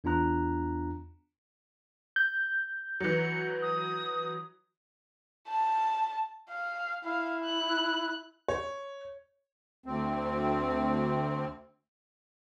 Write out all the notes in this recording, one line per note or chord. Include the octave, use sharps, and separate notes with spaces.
E2 B3 D4 F4 A#5 F#6
G6
E3 F#3 C#7
D#6
A5
F5
E4 F5
F#6
C#5
D2 C4